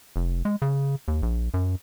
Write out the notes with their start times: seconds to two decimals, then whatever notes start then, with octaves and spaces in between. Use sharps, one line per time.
0.16 F1
0.45 G#3
0.62 C#3
1.08 D#2
1.22 A#1
1.54 F#2